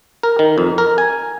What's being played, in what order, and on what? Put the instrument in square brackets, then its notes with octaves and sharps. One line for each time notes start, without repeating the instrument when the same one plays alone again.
[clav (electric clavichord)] A#4
D#3
F2
A#4
G#5